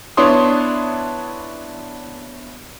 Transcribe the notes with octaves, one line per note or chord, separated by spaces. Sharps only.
B3 D4 E4 C#5 C6 D#6